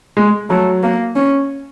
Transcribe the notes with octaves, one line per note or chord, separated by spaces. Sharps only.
G#3
F#3 A3
A#3
C#4